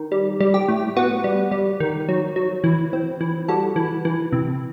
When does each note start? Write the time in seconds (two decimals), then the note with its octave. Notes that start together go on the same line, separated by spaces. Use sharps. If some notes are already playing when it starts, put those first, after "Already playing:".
Already playing: D#3
0.12 G3
0.40 G3
0.54 G4
0.68 A2
0.97 B3 F#4
1.24 G3
1.51 G3
1.80 D#3
2.09 F#3
2.36 F#3
2.64 E3
2.93 C4
3.21 E3
3.48 G3 F#4 A4
3.76 E3
4.05 E3
4.33 C3